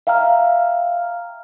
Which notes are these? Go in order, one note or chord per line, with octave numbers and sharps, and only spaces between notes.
E5 F5 G5 A#5 F6